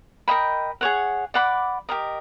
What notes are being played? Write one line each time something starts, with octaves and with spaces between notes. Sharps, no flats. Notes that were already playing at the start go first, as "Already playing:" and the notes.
A#4 D#5 G5 B5
G#4 C#5 F#5
D5 F#5 B5 D6
G4 A#4 D#5